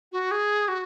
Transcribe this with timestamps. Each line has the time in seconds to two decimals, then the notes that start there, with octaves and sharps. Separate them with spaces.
0.12 F#4
0.31 G#4
0.68 F#4